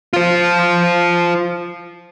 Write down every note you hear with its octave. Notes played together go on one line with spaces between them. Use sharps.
F4 C5